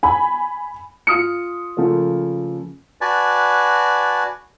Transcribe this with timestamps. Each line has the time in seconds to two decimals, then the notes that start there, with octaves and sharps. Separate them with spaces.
0.03 G#5 B5
1.07 F4 D#6 F6 C#7
1.77 C#3 F3 A3 A#3
3.01 F#4 B4 D5 G#5 A5